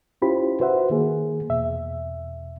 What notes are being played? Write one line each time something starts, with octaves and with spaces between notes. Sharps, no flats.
C#4 E4 F4 G4 C5 B5
F#4 B4 C5 E5 F#5
D#3 A#3 G#4
E2 B2 E5